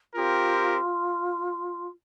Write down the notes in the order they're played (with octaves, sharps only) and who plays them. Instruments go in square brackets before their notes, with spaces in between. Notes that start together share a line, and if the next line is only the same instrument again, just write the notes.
[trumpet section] C4 G4 A#4 [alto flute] F4